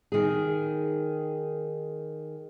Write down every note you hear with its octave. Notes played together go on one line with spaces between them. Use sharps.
D#3 G#4